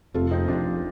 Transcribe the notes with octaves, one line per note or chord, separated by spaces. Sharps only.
F1 F2 C3 F4 A4
C4 D#4
F1 F2 C3 D4 F4